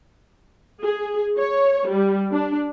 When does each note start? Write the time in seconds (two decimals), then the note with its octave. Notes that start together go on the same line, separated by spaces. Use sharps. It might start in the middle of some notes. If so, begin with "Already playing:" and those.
0.83 G#4
1.38 C#5
1.89 G3
2.31 D4